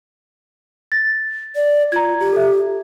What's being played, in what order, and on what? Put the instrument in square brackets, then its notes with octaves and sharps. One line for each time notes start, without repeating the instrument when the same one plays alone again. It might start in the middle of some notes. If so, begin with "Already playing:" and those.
[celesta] A6 A#6
[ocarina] D5
[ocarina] F4 [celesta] A#5 G#6
[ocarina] G4
[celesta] A4 E5